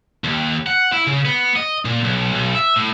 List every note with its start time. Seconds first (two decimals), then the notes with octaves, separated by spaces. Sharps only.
0.24 D#2
0.67 F#5
0.93 E4
1.07 C#3
1.25 B3
1.56 D#5
1.85 A#2
2.04 B1
2.33 B1
2.55 E5
2.76 A2